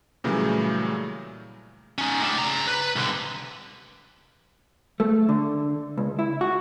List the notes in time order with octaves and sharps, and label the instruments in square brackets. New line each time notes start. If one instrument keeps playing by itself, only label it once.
[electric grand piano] A#2 C#3 E3 F#3 G3 A3
[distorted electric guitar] C#4 D#4
A2 D4
C#3 A#5
B4
C2 D3
[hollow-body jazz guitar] A3
D3
C#2
E4
F#4